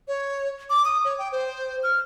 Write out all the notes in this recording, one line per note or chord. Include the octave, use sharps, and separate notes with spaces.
C#5
D6
D#6
C#5
G5
C5
F6